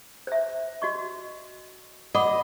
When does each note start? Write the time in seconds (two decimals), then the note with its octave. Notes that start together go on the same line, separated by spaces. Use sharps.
0.27 C5 E5
0.82 F#4 D#5 C#6
2.15 D#5 F#5 B5 D6